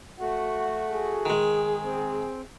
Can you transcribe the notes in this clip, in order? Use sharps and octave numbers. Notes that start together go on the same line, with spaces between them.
A3 F#4 F#5
G#4
D#3 G#3
C4